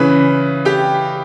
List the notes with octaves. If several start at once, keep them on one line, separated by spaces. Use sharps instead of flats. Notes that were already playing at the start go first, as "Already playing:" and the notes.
Already playing: C#3 E3 B4 B5
G4 G5